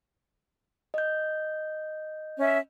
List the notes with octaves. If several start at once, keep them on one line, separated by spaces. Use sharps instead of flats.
D#5 G6
C#4 E5